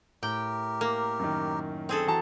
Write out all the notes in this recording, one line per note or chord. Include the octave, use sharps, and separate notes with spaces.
A2 G4 A#4 G5
A#3
F#2 D#3
C4 G#4 A4
E3 F#4 A5 A#5